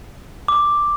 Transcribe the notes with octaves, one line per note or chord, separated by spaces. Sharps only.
D6